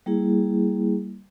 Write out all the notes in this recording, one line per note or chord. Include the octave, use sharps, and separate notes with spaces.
G3 A#3 E4 G#4